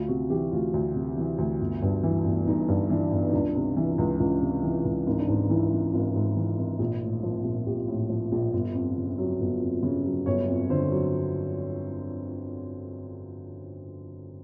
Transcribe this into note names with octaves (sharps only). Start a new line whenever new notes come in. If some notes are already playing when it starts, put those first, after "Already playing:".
Already playing: D2 F4
C3 F#4
E3 G4
D2 F4
D2
C3
E3
D2
G1
G2
E3
G1
G1 D#4
G2
E3 D4
G1
D#4
C#2 D4
C3
E3
C#2
C#2
C3
E3
C#2
G#1 D#4
D4
G#2 D#4
E3 E4
G#1
G#1 F4
G#2
E3
G#1
A#1
A2
F3
A#1
A#1 G4
A2
F3
A#1
G1
F2
C#3
F#3
G1
F2
C#3
F#3
G1 C#5
F2
D3 C5
F#3